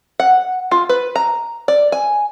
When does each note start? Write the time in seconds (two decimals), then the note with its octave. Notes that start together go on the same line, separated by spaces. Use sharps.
0.20 F#5
0.71 F4
0.89 B4
1.16 A#5
1.68 D5
1.92 G#5